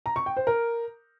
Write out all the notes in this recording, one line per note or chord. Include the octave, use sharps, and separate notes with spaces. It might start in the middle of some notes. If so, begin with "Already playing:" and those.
A#5
C#6
G5
C5
A#4